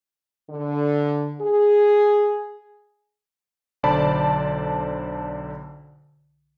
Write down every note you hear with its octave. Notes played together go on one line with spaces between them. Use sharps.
D3
G#4
B1 D3 C5 D5 A5 B5